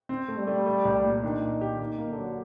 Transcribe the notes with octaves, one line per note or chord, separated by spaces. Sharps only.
C4
A3
G3
A3
A3
C2
A#2
D#3 D4
A#2
G4
D#3 A#3
A#3
D3
F#3